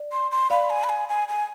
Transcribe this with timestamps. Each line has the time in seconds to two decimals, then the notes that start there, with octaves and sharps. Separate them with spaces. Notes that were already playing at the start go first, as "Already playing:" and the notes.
Already playing: D5
0.12 C6
0.31 C6
0.50 D5 F5 B5
0.70 G#5
0.84 B5
0.89 G#5
1.09 G#5
1.28 G#5